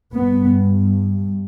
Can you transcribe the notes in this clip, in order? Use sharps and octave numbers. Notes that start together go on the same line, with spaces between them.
G2 B3